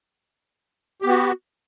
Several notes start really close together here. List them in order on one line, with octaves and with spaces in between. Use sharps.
G4 B3 F#4